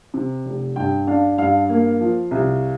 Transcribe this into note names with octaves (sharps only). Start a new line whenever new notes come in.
C3
F1
G2 G5
D4 F5
G2 F5
A#3
F3
C2